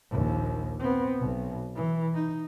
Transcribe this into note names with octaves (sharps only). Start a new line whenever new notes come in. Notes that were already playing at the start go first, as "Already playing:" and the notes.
A#1 D#2
B3 C4
B1 B2
E3
D#4